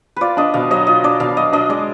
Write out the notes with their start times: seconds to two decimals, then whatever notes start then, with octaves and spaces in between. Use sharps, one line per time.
0.16 F4 B4 D5
0.37 D4 D#5
0.54 B2 F5
0.70 F#3 D#5
0.87 F4 D#5
1.04 D4 D5
1.20 B2 F5
1.37 F#3 D#5
1.53 D4 D#5
1.69 G#3 D5